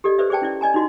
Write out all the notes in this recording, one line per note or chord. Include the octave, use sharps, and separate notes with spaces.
G4 A4 D5 D#5
A4 B4 C5 D5 E5
G#4 C5 D5 G5 A5
C#4 E4 D5
D5 D#5 G#5 A#5
D#4 E4 F#4 D#5 C6